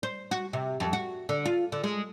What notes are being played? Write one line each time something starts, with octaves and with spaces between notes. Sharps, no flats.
C5
F#4
C3
F2
F#4
D3
F4
D3
G#3